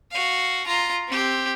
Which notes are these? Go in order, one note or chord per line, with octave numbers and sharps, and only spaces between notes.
F#4 F5
F4 A#5
C4 G4